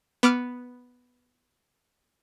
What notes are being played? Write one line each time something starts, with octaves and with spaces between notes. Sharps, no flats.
B3 D6 F6 D7